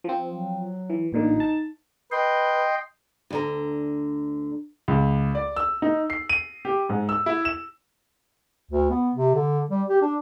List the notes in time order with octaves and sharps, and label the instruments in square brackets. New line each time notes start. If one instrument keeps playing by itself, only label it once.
[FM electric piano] F3 C4
[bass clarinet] F#3
[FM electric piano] E3
[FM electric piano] A1 A#2 D3 [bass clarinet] D#4
[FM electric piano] A5
[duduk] B4 [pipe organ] D#5 G5 C6
[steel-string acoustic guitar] D2 D3 A#5
[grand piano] C#2
D5
E6
D#4
C7
D#7
G4
G#2
E6
E4
E7
[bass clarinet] D2
B3
C3
D3
G3
G4
D4